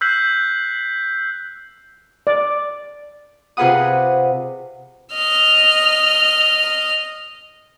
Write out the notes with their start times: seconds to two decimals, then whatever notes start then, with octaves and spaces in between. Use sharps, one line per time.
0.01 E6 F#6 G6 B6 C7 F#7
2.27 D5
3.57 C3 F4 G#4 B4 F#5 D#6
5.13 D#5 F6